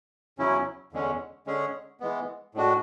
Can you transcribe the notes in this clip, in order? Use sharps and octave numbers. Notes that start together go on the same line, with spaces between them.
E2 C#3 F#3 C#4 E4
E2 D3 G#3 C#4
D3 G#3 C#4 G#4
E3 G#3 B3
A2 G#3 D4 F#4